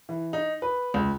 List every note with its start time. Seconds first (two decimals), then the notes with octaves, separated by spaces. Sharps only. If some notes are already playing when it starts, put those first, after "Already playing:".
0.09 E3
0.33 D#4
0.62 B4
0.94 C#2